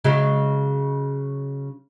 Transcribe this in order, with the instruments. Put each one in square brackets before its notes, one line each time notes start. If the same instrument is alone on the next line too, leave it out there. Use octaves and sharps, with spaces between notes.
[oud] C#3 F#3 G#3